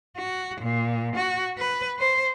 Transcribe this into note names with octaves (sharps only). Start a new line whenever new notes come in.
F#4
A#2
F#4
B4
C5